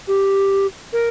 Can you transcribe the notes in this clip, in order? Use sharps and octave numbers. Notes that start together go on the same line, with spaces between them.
G4
A#4